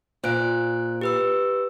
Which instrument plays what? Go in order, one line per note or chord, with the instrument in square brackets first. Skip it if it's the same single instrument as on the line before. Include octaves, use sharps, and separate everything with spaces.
[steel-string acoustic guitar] A#2 [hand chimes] C5 F#6 D7
[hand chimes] G4 B4 E6